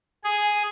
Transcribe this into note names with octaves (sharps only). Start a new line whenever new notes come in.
G#4